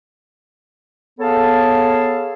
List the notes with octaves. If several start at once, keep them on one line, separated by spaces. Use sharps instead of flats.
B3 G#4 A4 C#5 F5 A5